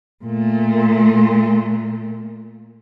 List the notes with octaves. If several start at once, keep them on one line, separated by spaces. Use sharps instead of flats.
A#2 A3